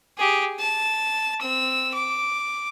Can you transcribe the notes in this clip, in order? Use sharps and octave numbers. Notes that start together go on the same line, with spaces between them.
G4 G#4
A5
C4 E6
D6